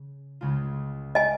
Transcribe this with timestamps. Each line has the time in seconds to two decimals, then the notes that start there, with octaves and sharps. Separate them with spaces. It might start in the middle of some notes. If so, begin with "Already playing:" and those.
Already playing: C#3
0.41 C#2 C#3 G#3 F4
1.15 D#5 G#5